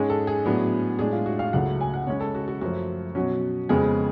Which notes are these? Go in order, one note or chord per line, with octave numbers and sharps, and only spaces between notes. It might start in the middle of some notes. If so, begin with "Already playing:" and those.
Already playing: G#2 G#3 C#4 G#4
A4
G#4
A2 F#3 B3 D4
A2 G#3 D4 G#4
F4
F#4
F5
C#2 C#3 F#3 A3 F#5
G#5
F#5
C#3 G#3 C#4 C#5
A4
F#4
F#4
F#2 F3 A3 F#4
B2 F#3 C#4
F2 C#3 G#3 B3 G#4